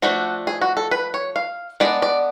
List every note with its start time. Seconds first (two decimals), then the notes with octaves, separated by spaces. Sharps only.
0.02 F3 A3 D4 F#4
0.47 G#4
0.61 F#4
0.77 A4
0.91 B4
1.14 C#5
1.36 F5
1.80 G#3 B3 D4 D5
2.02 D5